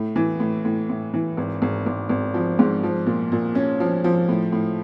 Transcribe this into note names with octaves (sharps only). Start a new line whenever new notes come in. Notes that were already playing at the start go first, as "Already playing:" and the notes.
Already playing: A2
E3
A2
A2
A2
E3
G#1
G#1
G#1
G#1
F3
G#2
F3
A#2
A#2
C#4
F3
F3
A2
A2